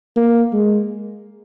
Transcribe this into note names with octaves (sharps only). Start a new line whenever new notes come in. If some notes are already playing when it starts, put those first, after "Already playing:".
A#3
G#3